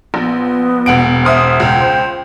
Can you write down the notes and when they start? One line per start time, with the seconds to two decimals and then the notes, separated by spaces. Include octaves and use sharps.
0.14 A#1 B3
0.86 E1 F#5 D7
1.25 C5 E5 D#6 F6
1.60 C#2 G5
1.81 C5